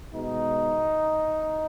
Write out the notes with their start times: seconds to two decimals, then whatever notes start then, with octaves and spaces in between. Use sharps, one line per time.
0.13 B2 G#3 B3 D#4